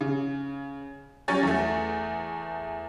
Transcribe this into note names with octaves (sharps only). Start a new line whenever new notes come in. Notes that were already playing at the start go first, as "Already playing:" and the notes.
C#3
F#3 G3 C#4 C#5 G#5 A6
E2 A3